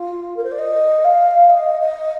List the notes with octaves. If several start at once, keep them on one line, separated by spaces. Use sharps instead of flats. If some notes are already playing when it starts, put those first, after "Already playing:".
Already playing: F4
A#4
C5
D5
D#5
F5
D#5
D#5